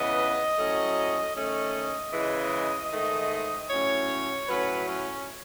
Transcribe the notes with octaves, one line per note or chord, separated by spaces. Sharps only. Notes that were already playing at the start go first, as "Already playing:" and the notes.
Already playing: C#3 E3 B3 D#5
A2 F#3 A3 C#4
D#3 A3 C#4 D#5
C#3 E3 G#3
G#2 D#3 A3
A2 F#3 C#4 C#5
A2 F#3 C#4 B4
C#4